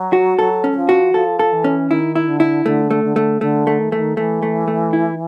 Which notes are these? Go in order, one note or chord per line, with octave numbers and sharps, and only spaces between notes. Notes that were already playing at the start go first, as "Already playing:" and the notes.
Already playing: F#3
F#4
F#3 A4
C#4
F#3
F3
F#4
F3 A4
A4
E3
C#4
D#3 E4
E4
D3
E4
D3 A3
A3
D3
A3
D3 A3
A3
D#3
E3 A3
D#3
E3 A3
A3
A3
E4